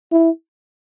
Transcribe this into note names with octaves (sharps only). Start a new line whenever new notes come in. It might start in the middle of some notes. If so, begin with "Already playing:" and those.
E4